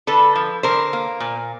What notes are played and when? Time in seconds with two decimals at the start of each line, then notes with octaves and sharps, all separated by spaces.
0.07 D3 A4 B4
0.35 F3
0.63 D3 A#4 C5
0.93 A#3
1.20 A#2